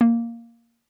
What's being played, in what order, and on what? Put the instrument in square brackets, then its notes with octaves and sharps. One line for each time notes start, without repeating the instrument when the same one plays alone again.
[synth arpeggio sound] A#3